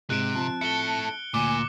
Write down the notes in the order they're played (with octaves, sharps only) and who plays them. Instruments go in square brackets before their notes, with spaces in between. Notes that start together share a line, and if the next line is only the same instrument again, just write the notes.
[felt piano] G#2 [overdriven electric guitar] C3 [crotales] F#6 D7
[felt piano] F3 C4 [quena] A5
[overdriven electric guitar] E4 A4 [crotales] C#7 G7
[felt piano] D2 [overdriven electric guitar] A#2 [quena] G#5 [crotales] D6